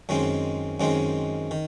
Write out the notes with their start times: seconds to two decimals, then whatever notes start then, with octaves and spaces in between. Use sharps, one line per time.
0.09 F#2 D#3 G#3 C4
0.80 F#2 D#3 G#3 C4
1.51 D#3